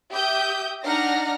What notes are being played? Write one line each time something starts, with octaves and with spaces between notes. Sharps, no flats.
G4 E5 D#6 G6
D4 D#4 F#5 A#5 F6 A#6